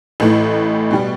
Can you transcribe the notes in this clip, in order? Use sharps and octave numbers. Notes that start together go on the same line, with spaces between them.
A1 A2 E3
B2 G3 B3